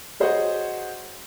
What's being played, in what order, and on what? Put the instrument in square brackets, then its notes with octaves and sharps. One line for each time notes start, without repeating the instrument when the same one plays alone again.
[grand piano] F#4 G#4 C5 C#5 D#5 F#5